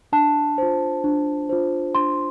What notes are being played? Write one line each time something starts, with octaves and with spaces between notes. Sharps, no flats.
D4 A5
F4 C5
D4
F4 C5
D4 C6